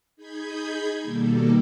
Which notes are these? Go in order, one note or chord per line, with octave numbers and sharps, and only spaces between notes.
D#4 G#4 B5 G6 G#6
B2 D#3 G3 A#3 A4